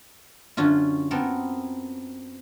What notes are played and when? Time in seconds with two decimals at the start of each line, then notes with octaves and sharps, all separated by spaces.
0.57 F#2 D3 C#4 F4
1.11 B3 C4 A4 A#4